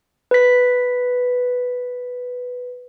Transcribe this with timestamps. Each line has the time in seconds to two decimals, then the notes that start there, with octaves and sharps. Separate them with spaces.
0.31 B4 B6